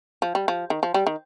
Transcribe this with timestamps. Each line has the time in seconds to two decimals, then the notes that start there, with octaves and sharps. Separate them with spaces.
0.22 F3
0.35 G3
0.48 F3
0.70 D#3
0.83 F3
0.94 G3
1.07 D#3